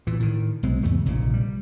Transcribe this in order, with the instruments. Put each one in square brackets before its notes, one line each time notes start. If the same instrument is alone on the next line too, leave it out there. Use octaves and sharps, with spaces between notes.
[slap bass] A#2 E3
A2 D#3
B1 B2 G#3 C4
E2 G#2 C#3 A3
F1 A#1 A#2 C#3
G3